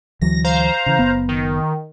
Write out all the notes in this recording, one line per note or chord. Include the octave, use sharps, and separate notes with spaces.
D2 E3 F#3 A#6
C5 F5 A#5
C#3 E3
F#1 B3
D#3